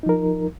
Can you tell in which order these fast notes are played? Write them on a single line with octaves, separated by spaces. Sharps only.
D#4 F3 A#4